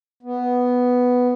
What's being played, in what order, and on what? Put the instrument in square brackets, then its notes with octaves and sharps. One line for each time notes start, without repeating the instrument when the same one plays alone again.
[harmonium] B3